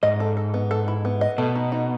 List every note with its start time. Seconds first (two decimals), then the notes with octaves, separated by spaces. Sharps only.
0.03 G#2 D#5
0.20 A4
0.37 A4
0.54 B3
0.71 A4
0.88 E4
1.05 B3
1.21 D#5
1.38 B2 A3
1.55 D#4
1.72 D#4